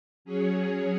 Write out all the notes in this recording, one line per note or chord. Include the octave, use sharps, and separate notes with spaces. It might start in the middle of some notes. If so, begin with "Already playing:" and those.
F#3 C#4 G#4 C#5